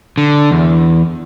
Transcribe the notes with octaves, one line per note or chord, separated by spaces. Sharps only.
D3
E2